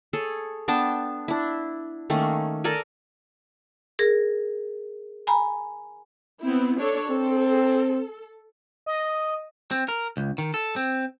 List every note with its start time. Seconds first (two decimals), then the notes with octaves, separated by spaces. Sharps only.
0.13 G#4 A4 C#5
0.68 B3 D4 G5 A5
1.28 D4 E4
2.10 D#3 A3 A#3 C#4
2.64 A4 A#4 D5 G#5
3.99 G#4 A#4
5.27 G#5 A#5 B5
6.42 B3 C4 E4
6.80 D4 A4 C#5
7.10 C4 A4
8.86 D#5
9.71 C4
9.88 A#4
10.17 C#2
10.38 D#3
10.54 A4
10.76 C4